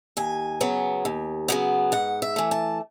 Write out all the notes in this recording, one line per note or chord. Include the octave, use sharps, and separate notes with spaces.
D#2 G#5
C#3 F#3 B3
D#2
C#3 F#3 B3
G#2 F#5
E5
E3 A3
A5